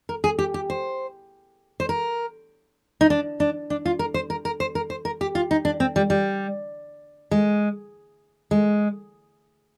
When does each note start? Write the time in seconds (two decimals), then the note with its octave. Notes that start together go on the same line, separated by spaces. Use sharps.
0.09 A#4
0.24 G#4
0.39 G4
0.54 G4
0.70 C5
1.80 C5
1.89 A#4
3.01 D#4
3.10 D4
3.40 D4
3.70 D4
3.86 F4
3.99 A#4
4.14 C5
4.30 A#4
4.45 A#4
4.60 C5
4.75 A#4
4.90 C5
5.05 A#4
5.21 G4
5.35 F4
5.51 D#4
5.65 D4
5.80 C4
5.96 G3
6.10 G3
7.31 G#3
8.51 G#3